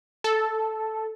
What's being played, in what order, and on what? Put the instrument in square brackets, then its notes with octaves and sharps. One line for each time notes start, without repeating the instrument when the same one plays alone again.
[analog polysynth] A4